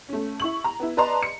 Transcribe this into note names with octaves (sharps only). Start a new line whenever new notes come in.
A3 C#4
E4 C#6 F#7
A#5
B3 E4
B4 D5 D#5 A5 A#5 C6
C#7